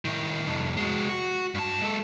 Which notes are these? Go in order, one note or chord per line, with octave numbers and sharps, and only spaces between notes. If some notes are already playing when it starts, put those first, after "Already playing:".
A2 D#3
C2 F2
G#3 F#4
F#4
G2 A5
G#3 A4